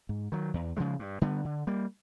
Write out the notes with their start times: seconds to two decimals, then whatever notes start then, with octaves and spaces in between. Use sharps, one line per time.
0.09 G#2
0.32 D#3 F#3
0.54 E2
0.77 C#3 F3 G#3
0.99 G2
1.21 D3 G3 B3
1.45 D3
1.67 G3 A#3